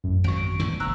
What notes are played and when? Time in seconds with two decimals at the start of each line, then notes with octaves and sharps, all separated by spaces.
0.04 A1 F#2
0.24 G#1 F#3 C#6 D7
0.59 A1 E2 D3
0.80 F#1 A#5 E6 F#6